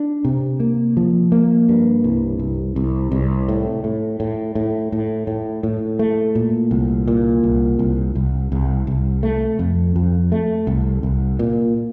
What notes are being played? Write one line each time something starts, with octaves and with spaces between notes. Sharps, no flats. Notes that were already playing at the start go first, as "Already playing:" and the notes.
Already playing: D4
C3
A#3
F3
A#3
G2
C2
C2
C2
C2
A2
A2
A2
A2
A2
A2
A2
A3
A#2
C2
A#2
C2
C2
C2
C2
C2
A3
F2
F2
A3
C2
C2
A#2